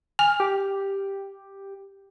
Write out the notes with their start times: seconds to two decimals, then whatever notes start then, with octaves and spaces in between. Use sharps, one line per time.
0.19 G#5 F6
0.40 G4